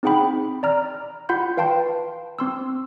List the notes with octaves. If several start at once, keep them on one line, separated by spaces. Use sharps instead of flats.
C4 D#4 G#4 F#5 G5 B5
D5 A#5 F6
F4 F#5 B5 C6 G6
B4 F5 G5 A5 C6
C4 C6 E6